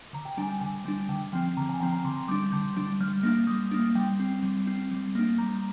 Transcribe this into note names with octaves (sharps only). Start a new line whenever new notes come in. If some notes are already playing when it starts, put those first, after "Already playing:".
D3 A#5
G5
G3 D4 G#5
G#5
D3 G#5
G3 D4
D3 G5
F3 C4 G5
D3 A#5
G#5
F3 C4 G5
A#5
D3 C6
G3 D4 D6
D3 G6
G3 D4
G3 F6
A#3 D4
G3 D#6
A#3 D4
G3 G5
C4
G3
C4
G3
A#3 D4
G3 A#5